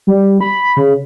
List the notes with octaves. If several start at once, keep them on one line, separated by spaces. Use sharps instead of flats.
G3
B5
C#3